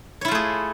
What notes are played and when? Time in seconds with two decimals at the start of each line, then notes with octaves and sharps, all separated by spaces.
0.21 C#5
0.25 E4
0.28 F4
0.31 A3
0.35 G#4